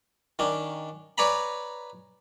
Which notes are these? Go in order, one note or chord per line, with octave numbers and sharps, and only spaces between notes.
D#3 C#4 D4
B4 C#5 D5 G#5 A#5 B5